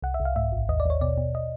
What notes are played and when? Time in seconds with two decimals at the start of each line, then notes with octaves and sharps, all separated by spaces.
0.02 C2 F#5
0.14 E5
0.20 C2
0.25 F5
0.36 G#2 E5
0.52 A1
0.69 D#2 D#5
0.80 D5
0.85 D#2 C#5
1.01 B2 D5
1.18 B2
1.35 D#5